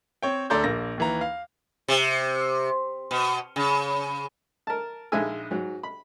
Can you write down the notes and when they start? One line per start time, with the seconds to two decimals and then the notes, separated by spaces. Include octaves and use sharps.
0.23 C4 C#5 G5
0.50 D2 A4 D5 A#5 C6 G6
0.64 A#1 A#3 A#6
0.98 D#2 E3 A#5
1.21 F5
1.88 C3
3.11 B2
3.56 C#3
4.67 A#4 A5
5.12 A#1 G#3 D#4 E5 G#5 E6
5.51 G#2 F#3
5.83 B5